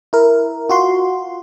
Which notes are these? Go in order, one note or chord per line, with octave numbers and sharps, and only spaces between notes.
E4 A#4
F4 F#4 C6